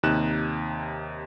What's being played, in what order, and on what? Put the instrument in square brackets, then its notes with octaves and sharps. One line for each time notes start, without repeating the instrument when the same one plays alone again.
[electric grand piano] D#2 C3 D#4 F#6 E7